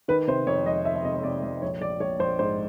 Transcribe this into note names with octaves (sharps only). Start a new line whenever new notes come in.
D#3 B4
C3 C5
F2 C#5
F1 D#5
F1 E5
E5
C3 D#5
C#5
C3 D5
F1 D5
A#1 C#5
A#1 D5
A#1 C#5
A#1 C5
G#2 C5